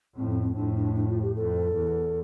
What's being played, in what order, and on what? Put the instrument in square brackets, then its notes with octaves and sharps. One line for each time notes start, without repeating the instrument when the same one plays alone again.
[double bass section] F2 A2 [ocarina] C4
[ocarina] C4
C4
[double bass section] F2 A2 [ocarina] D4
[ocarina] D4
D4
F4
G4
[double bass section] F2 [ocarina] A4
[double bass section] E2